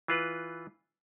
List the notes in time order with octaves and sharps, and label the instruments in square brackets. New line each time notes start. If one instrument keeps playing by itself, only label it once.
[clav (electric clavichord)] E3 F4 B4